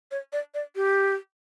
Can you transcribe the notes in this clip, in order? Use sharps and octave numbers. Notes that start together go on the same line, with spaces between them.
C#5
D5
D5
G4